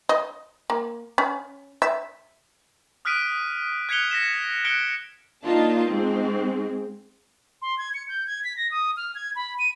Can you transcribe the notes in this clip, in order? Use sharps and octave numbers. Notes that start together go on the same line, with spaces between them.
D#5
A#3
C#4
E5
D#6 F6 F#6 B6 D7 D#7
F#6 G#6 B6 C#7 F7 G7
A#6 B6 E7
F#6 B6 C#7 D7 G7
A#3 D4 D#4 F4 A5
G#2 C4
C6
G#6
C#7
G6
G#6
B6
A#6
D#6
F6
G#6
B5
D#7